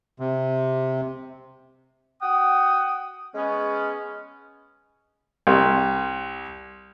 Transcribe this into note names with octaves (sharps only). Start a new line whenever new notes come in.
C3
F#4 F#5 G5 D#6
G#3 B3 C#4
C2